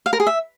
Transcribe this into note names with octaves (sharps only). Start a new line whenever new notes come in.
F5
A#4
G#4
E5